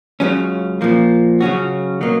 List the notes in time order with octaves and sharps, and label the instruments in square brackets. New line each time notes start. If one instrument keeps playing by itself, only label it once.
[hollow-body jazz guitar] C#2 C#3 F#3 C#4
A#2 F3 A#3
C#3 F#3 C#4 F#4
B2 F#3 A#3